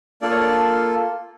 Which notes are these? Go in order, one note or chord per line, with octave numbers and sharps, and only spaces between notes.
A#3 D4 F4 A4 D5
C#5
D4 D5